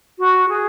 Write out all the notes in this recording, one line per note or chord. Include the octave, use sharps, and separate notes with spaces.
F#4
G#4